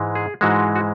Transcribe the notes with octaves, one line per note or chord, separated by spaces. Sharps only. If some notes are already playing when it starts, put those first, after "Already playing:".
Already playing: G#2 E3 G#3
G#4
G#2 E3 G#3 F#4
F#4